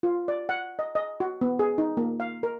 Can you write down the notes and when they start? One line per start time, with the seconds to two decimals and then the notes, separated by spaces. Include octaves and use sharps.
0.03 F4
0.28 D5
0.49 F#5
0.79 D#5
0.95 D#5
1.20 F#4
1.41 B3
1.59 G#4
1.78 D#4
1.97 A#3
2.20 F5
2.43 A#4